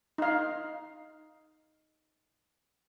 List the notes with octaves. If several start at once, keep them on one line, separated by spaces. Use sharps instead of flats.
D#4 F5